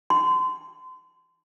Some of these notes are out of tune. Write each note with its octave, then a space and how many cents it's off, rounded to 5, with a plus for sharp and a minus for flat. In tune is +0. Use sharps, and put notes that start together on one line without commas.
C6 -35